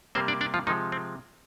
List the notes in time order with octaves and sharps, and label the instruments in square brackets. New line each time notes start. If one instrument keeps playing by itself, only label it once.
[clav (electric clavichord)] C3 G3 A#3 C4 C5
D4 D5
D4 D5
F3 F4
C3 D#3 F3 G#3 D#4
C4